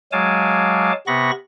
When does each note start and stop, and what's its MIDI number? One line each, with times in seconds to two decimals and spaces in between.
0.12 0.92 54
0.12 0.92 56
0.12 0.92 77
0.12 0.92 80
0.12 0.92 81
0.12 0.92 86
1.07 1.31 48
1.07 1.31 59
1.07 1.31 83
1.07 1.31 85
1.07 1.31 94